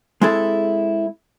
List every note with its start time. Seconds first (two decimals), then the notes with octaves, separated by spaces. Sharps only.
0.21 G#3 C4 E4 G#4 A4